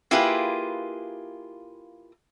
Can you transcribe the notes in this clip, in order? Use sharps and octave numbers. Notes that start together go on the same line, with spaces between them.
A#3 E4 F4 G4 G#4 B4